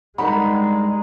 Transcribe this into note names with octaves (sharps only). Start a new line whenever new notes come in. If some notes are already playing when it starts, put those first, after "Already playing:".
G2 G3 G#3 D#4 A#4 F#5 B5